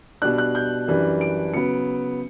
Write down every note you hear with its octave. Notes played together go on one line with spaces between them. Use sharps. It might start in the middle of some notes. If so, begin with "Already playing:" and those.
B2 G3 D4 F#6
F#6
G6
F#2 E3 G3 D4
D7
C#3 F#3 B3 C#7